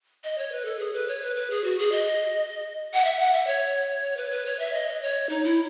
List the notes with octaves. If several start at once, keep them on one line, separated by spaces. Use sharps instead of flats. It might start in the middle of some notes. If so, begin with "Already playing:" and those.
D#5
C#5
B4
A4
G#4
B4
C#5
B4
B4
G#4
F#4
G#4
D#5
F#5
E5
F#5
E5
C#5
B4
B4
C#5
E5
D#5
D#5
C#5
D#4
E4